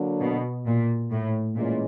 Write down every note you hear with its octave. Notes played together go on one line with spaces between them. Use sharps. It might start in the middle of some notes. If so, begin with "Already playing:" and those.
Already playing: D3 F#3 A#3 D4
B2
A#2
A2
A#2 E3 G#3 C#4